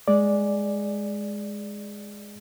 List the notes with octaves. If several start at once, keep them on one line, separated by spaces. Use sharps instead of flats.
G#3 D5